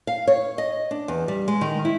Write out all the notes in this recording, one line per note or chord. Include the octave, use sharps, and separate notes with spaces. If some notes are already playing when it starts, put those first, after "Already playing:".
F5
C#5
D#5
D4
E2
G3
G#3
D#3
E4